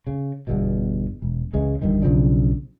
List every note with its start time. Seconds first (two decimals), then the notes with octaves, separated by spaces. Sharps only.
0.07 C#3
0.47 G1 E2 B2
1.22 E1
1.53 C#2 C#3 E3 G#3
1.82 G1 E2 G2 D#3
2.02 B1 C#3 F3 D4